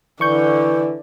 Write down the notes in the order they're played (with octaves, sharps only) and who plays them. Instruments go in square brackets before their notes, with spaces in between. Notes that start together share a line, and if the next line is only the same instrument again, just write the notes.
[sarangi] D3 [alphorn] E3 [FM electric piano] C#6 G6